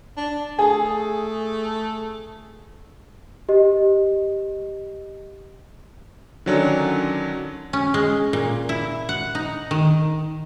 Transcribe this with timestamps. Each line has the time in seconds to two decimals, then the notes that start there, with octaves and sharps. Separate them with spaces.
0.17 D4
0.59 A3 G#4
3.49 G4 D#5
6.46 D3 D#3 F#3 C#4 D4
7.73 C#4
7.94 G#3
8.33 A#2
8.69 E4
9.09 F#5
9.35 D#4
9.71 D#3